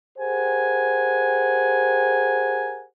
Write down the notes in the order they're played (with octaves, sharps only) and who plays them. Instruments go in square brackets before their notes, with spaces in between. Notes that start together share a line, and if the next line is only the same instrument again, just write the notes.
[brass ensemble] G4 G#4 A#4 C5 F#5 G#5